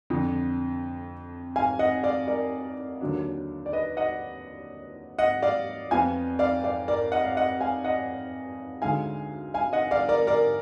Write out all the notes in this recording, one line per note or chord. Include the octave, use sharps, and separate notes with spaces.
F2 D3 F3
F5 G#5
D#5 F#5
D5 F5
A#4 D5
D#2 D3 F#3 D4
D5
B4 D#5
D#5 F#5
D#5 F#5
D5 F5
F2 F3 B3 F5 G#5
D5 F5
D5 F5
A#4 D5
D#5 F#5
F5
D#5 F#5
F5 G#5
D#5 F#5
D2 D3 G#3 D#4 F5 G#5
F5 G#5
D#5 F#5
D5 F5
A#4 D5
A#4 D5